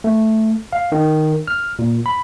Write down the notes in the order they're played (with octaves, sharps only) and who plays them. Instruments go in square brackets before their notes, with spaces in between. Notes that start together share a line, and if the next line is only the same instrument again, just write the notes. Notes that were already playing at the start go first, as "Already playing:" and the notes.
[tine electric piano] A3
F5
D#3
F6
A#2
B5